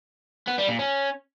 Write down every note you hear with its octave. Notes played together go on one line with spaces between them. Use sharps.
B3
G3
A#2
C#4